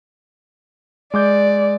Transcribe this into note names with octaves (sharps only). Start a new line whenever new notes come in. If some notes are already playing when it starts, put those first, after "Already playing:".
G#3 D5 D6 G6